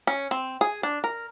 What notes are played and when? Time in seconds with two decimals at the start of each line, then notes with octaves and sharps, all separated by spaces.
0.07 C#4
0.31 C4
0.61 G#4
0.83 D4
1.04 A#4